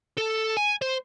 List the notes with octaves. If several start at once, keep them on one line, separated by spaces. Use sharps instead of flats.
A4
G#5
C5